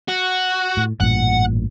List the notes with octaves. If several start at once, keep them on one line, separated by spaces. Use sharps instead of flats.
F#4
A2
A1 G2 A#2 F#5